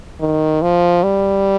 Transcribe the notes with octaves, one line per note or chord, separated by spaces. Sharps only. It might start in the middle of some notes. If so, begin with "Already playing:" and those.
D#3
F3
G3